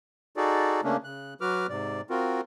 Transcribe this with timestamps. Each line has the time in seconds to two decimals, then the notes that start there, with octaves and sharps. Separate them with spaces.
0.37 D#4 F#4 G#4 A4 D5
0.84 C#3 A3 A#3 C#4 D4
1.04 C#3 F#6
1.41 F#3 F#4 B4 D6 F6
1.69 G#2 C3 D5
2.10 C4 F4 F#4 A#4